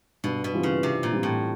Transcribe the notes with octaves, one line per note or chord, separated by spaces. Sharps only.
G2 B2
B2
E3 G3 C4 F4
C#3
G2 C3
A#2
E3 G3 C4 F4
A2